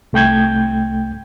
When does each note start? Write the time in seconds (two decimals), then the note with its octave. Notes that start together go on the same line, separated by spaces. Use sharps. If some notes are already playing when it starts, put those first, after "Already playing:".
0.13 C2 A3 G5 G6 G#6